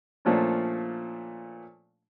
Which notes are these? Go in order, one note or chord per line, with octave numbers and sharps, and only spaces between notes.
A#2 F3 A3 C#4 D4